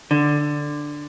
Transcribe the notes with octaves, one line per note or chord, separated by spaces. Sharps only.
D3